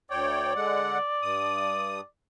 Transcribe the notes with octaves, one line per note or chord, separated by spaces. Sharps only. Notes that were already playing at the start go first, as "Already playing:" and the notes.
D2 C#5 D5 G5
D3 G#3 F#5
G2 D#6